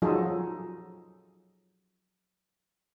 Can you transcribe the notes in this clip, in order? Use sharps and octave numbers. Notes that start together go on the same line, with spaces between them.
F3 F#3 D#4 F4 G#4 A4